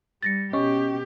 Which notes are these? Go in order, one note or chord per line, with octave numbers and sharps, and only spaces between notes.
G3 A6 A#6 C#7
B2 C#4 G4 D#5 C#6